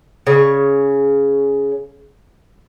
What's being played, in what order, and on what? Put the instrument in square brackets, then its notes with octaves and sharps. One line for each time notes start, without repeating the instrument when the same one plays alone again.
[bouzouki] C#3 C#5